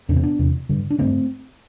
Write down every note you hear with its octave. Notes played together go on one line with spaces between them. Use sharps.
E2 C3 D4
C4
B3 D4
E2 C3
G2 D3
D4
G2 D3 A3 C4